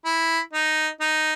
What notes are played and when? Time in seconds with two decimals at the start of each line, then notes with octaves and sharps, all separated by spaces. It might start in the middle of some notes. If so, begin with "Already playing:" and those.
0.05 E4
0.53 D#4
1.01 D#4